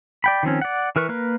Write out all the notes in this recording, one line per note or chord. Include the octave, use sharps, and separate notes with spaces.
D5 G5 B5
D#3 F3 C4 C#4
D5 F#5
E3 A#4 B4 C#6
A#3 A#4 B4